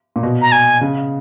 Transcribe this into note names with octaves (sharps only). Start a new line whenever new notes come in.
A#2
B2
A#5
G#5
C#3